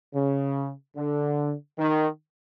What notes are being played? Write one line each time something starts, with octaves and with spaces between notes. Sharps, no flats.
C#3
D3
D#3